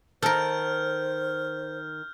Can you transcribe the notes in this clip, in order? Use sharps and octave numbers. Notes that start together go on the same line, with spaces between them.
D#3 A4 A#4 C5 F6 G6